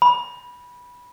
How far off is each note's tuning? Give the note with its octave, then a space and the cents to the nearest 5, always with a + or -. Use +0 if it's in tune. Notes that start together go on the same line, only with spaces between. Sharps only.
B5 -15